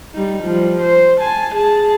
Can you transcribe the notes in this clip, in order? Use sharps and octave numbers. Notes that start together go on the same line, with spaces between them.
G3 D#4
F3 G3
C5
G#5 A5
G#4 A5